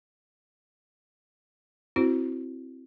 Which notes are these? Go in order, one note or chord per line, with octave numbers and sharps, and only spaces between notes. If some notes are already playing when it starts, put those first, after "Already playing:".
C4 E4 F#4 C5